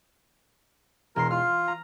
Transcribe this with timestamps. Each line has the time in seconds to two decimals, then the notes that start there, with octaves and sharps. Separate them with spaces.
1.16 E1 A#4 C6 C7
1.31 F4 F6
1.68 A#5